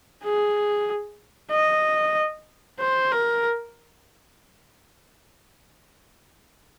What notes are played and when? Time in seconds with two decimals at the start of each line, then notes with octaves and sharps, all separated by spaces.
0.24 G#4
1.51 D#5
2.80 C5
3.12 A#4